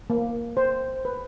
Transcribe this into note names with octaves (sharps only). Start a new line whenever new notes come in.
A#3
C5
B4